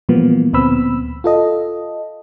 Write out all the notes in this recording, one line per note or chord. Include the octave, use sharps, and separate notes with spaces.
A#2 E3 F3 G3 A#3 B3
D2 A#2 B3 C4 B5 E6
F4 A4 D#5